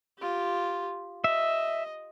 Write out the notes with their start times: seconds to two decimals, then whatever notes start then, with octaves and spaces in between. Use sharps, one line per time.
0.18 F4 G4
1.24 D#5 E5